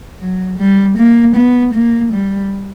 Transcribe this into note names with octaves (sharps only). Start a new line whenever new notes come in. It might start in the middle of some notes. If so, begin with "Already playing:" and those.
F#3
G3
A#3
B3
A#3
G3